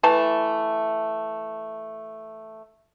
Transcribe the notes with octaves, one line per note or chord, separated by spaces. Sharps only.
E3 A3 A5